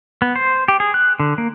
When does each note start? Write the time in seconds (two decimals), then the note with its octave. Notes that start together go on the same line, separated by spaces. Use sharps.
0.22 B3
0.36 C5
0.68 G4
0.80 G#4
0.94 F#6
1.20 D3
1.38 A#3